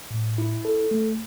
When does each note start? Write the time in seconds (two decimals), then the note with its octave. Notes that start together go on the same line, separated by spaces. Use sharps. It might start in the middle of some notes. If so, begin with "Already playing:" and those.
0.11 A2
0.38 E4
0.65 A4
0.91 A3